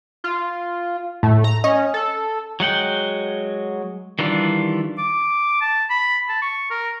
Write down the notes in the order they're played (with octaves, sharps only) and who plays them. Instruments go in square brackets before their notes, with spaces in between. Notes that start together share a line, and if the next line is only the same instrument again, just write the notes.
[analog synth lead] F4
[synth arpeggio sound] A2 [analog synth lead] A3
[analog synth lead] A#5
[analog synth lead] C#4 [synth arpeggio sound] D#5
[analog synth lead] A4
[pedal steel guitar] F#3 G#3 F#5 G5
D#3 E3 G3 D4 F4
[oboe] D6
A5
B5
A5
C#6
A#4